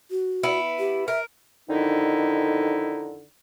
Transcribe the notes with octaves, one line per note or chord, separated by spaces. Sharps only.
F#4
B3 E4
G4
A#4 E5
F2 D3 D#3 D#4 E4